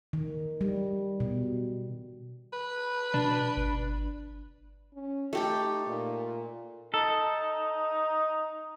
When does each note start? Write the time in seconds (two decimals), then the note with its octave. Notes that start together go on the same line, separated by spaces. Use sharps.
0.13 D#3
0.61 G3
1.20 B2
2.53 B4
3.14 B2 D4
3.57 G1
4.94 C#4
5.33 A3 D#4 G4 A4
5.87 A#2
6.94 D#4 A4